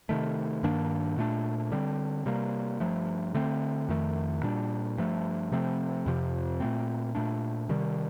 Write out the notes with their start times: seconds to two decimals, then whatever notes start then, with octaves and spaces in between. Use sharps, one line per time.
0.09 C3 D#3 A3
0.63 G2 D#3 A#3 D4
1.18 A#2 A3 D4
1.72 D3 G3 C4
2.26 C3 G3 A#3
2.80 G2 F3 A3
3.35 D3 A3 C4
3.89 F2 D#3 A3
4.43 A#2 G3 D4
4.98 G2 F3 A3
5.52 C3 F3 A3 C4
6.06 F2 C3 F3
6.60 A#2 A3 C4
7.15 A#2 A3 D4
7.69 C3 D#3 G3